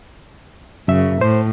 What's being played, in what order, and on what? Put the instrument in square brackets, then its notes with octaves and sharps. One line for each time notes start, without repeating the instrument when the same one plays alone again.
[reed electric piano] F#2 E5 [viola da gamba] C#3
[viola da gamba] A2 [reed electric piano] C5